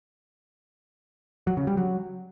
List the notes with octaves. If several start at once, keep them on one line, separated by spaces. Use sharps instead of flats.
F#3
C#3
G3
F#3